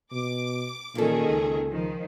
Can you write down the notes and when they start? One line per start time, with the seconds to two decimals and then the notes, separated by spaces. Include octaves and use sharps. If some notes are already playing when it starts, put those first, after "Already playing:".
0.12 B2 D6
0.95 A#2 D#3 A#3 C#4 G#4 A4
1.29 C#2
1.68 D#3 F3